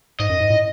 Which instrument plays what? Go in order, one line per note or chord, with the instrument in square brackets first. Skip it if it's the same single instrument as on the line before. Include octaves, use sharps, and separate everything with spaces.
[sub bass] G#2 [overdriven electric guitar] D#5
[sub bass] F#2
G#2
A2